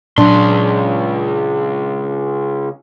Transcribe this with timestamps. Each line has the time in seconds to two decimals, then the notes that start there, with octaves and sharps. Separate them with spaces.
0.18 C#2 A#2 F#3 D4 C6